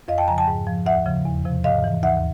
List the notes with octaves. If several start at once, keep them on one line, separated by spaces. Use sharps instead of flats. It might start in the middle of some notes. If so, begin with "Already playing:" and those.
F2 D#5 F5
G5 A5
C#3 F3 G#5 A#5
G5 A5
G#2
F3
D#2 E5 F#5
C#3 F3
E2
C3 F3
G#2 D#5 F5
E3
D#2 E5 F#5